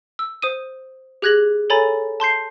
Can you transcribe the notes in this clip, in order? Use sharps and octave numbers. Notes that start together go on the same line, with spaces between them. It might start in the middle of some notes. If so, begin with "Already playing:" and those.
E6
C5 D#6 D#7
G4 G#4 F#6 G#6 A#6 F#7
A4 C#5 G#5 A#5 B5 A6
A5 C6 G6 C7